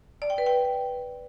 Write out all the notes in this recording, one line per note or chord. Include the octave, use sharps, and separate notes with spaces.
D5
G5
B4
G5